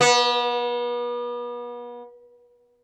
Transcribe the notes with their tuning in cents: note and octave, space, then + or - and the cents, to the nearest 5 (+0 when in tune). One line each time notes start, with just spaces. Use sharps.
B3 -35